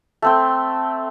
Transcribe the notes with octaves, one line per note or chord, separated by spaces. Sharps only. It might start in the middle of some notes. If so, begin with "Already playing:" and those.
A3 C4 G5